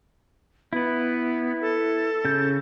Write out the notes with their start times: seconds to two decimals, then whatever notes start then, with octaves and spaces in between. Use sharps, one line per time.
0.73 B3 E4 B4
1.61 A4
2.25 C#3 G6